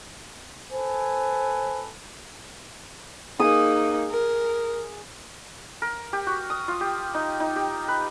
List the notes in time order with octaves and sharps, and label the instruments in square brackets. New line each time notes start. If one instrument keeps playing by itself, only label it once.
[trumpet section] A4 B4 G#5 [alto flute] C5
[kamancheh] A#3 D#4 [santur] G#4 D#6
[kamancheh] A#4
[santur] A#4
G4
F#4
D#6
F4
G4
D#4
D#4
G4
B4